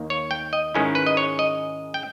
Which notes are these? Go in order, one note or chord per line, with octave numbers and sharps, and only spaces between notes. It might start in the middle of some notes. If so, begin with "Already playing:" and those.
Already playing: D#2 D#3 A#3
C#5
G5
D#5
G#2 D#3 G#3 C#4 E4
B4
D#5
C#5
D#5
G5